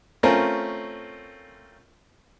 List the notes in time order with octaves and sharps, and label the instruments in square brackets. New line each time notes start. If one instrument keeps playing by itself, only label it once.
[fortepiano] A3 C4 C#4 F4 A#4